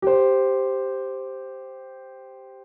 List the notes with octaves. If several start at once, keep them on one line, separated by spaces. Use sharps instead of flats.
G4 C5